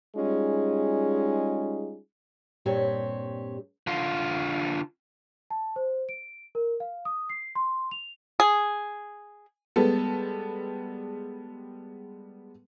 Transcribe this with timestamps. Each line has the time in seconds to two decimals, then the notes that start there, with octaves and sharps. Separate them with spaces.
0.15 G3 G#3 C#4 D#4 F4 G#4
2.66 G2 A#2 C4 G4 C#5
3.87 D3 F4
5.51 A5
5.76 C5
6.09 D7
6.55 A#4
6.80 F5
7.05 D#6
7.29 C7
7.55 C6
7.91 F7
8.40 G#4
9.76 G3 G#3 B3 A4